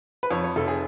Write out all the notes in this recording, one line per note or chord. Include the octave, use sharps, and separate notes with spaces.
B4
F2 C#5
C#5
F1 A4
G#4